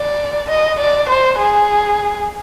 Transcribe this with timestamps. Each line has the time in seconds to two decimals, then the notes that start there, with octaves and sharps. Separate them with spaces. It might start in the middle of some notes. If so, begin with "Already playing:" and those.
Already playing: D5
0.50 D#5
0.80 D5
1.09 C5
1.39 G#4